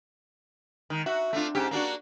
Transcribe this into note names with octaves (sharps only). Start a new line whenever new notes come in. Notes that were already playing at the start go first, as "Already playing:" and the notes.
D#3 G#3
F#4 E5
A3 C4 D4 F4
G#2 C#4 G4 G5 A5
A#3 D4 F#4